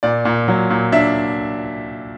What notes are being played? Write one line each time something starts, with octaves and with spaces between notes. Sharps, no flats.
A#2 D5
A#2
F#3
A#2
D4 E5